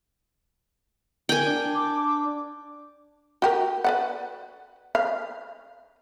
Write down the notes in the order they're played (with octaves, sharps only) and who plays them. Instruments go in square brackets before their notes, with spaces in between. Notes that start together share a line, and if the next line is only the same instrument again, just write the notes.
[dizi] A#4 [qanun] G5 G#5
[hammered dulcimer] D4
[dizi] D6
[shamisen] F#4 G4 A#4
B4 D5 F#5
F5